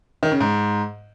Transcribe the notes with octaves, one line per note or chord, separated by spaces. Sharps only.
D#3
C#3
G#2